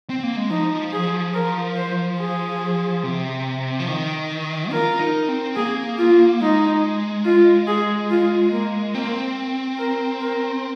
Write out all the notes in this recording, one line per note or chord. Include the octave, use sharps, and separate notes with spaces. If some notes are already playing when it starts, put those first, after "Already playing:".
C4
A#3
G#3
F3 D#4
G#4
A#4
C5
G#4
C3
F3
D#3
F4 A#4
D#4
C4
A#3 G#4
F4
G#3 D#4
F4
G#4
F4
A#3
A#3 C4
A#4
A#4